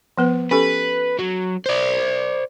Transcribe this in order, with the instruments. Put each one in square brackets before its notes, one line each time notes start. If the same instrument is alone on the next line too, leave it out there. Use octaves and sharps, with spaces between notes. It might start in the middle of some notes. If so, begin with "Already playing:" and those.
[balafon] F3 B3 B4
[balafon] C#4 G4 A4 [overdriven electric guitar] B4
[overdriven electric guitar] F#3
C5 D5